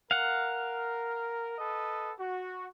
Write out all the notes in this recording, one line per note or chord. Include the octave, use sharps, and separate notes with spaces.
A#4 F5 F#5
A4 B4 D#5
F#4